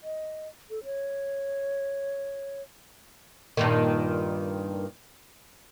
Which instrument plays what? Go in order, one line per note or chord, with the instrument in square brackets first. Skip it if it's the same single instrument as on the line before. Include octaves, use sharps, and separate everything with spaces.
[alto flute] D#5
A4
C#5
[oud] G2 A#2 D#3